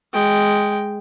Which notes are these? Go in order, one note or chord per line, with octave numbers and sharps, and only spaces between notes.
G#3 G5